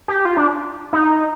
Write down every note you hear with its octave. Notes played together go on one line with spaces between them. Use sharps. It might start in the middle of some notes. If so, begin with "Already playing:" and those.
G4
F4
D4
D#4